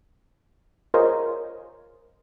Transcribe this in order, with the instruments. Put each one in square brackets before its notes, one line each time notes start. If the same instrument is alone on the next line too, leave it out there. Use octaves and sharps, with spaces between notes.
[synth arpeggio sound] F4 G#4 A#4 C5 C#5 D#5